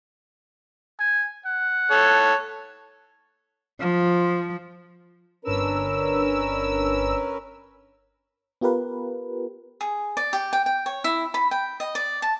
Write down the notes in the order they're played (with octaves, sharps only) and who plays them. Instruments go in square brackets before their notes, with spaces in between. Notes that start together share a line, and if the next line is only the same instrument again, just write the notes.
[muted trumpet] G#5
F#5
[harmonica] A4 C#5
[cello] F3
[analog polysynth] G1 D4 E6 [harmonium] C#4 A#4 B4
[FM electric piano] B3 F4 G4 A#4 B4
[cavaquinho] G#4
D5
G4
G5
G5
C#5
E4
B5
G5
D#5
D5
A5